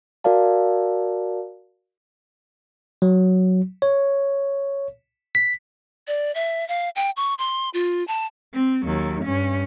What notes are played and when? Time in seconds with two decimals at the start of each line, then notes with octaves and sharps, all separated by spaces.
0.24 F#4 A#4 D5 F5 A5
3.02 F#3
3.82 C#5
5.35 B6
6.07 D5
6.35 E5
6.68 F5
6.96 G5
7.17 C#6
7.39 C6
7.74 F4
8.08 A5
8.54 C4
8.85 D#2 F#3
9.25 G2 C#4